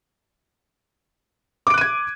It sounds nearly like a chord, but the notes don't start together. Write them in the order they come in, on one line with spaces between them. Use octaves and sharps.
D6 D7 F#6 D#7 G#6